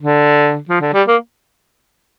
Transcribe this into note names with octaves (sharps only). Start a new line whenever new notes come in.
D3
F3
D3
G3
A#3